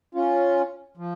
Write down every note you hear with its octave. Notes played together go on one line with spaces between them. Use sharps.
C#4 F4
F3